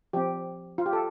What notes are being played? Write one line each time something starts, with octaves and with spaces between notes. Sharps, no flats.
F3 C4 G4
F4
G4
A4